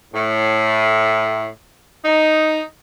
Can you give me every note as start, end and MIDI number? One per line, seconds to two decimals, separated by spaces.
0.13 1.47 45
2.04 2.61 63